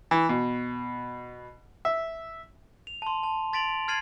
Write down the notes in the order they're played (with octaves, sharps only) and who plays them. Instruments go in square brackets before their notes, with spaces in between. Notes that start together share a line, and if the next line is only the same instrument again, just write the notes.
[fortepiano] E3
B2
E5
[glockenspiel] F7
A5 C6
A5
C6 A6 B6 D7 F7 F#7
F6 G#6 A6 C7 D#7 F#7